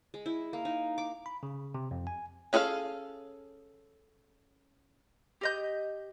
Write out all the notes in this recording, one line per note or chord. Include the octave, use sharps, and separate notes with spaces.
G#3
E4
A#3
D#4
D6
B5
C#3
C3
F2
G#5
C#4 G#4 A4 C#5 F5
G4 D#5 G6